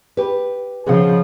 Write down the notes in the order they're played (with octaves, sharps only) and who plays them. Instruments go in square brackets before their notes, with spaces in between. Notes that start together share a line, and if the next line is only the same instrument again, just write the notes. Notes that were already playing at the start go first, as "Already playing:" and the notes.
[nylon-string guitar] G4 B4
[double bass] C#3 F3 [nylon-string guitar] G#4 D#5 F#5